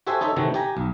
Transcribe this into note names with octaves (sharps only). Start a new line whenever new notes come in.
F#4 G4 A4 C5 E5 G#5
D#4 A4 C#5 E5
C3 D#3 E3 A3 F#4
G4 G#5 A#5
B1